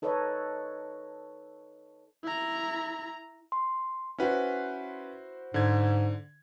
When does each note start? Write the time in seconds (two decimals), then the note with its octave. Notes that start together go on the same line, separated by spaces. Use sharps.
0.02 D#4 A4 B4 C#5 D#5
2.24 E4 A#5
3.52 C6
4.18 C#4 E4 F#4 B4 C5
5.54 G#2 D3 G#6